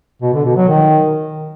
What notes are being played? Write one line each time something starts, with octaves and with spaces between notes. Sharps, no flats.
B2
D3
B2
F#3
D#3